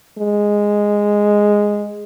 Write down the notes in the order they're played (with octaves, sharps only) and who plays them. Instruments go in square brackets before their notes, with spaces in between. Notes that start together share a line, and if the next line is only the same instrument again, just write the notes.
[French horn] G#3